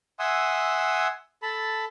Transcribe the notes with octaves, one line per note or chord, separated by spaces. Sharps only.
E5 F#5 G#5 C6 D#6 E6
A4 A5 B5